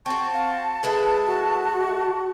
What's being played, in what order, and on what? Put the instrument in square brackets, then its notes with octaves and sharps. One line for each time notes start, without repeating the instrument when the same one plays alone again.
[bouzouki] C4 F#4 [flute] A5 [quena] C#6
[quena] F5
[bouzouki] G#3 E4 A4 [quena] B4
[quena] F#4